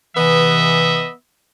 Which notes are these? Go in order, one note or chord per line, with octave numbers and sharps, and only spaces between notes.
C3 E3 B3 D#5 E5